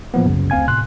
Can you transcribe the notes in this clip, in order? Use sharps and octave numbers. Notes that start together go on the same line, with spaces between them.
A2 E3 F3 A#3 B3
C2 F#2 C#3
D2 C4 F5 G#5 G#6
A2 C3 C6 F#6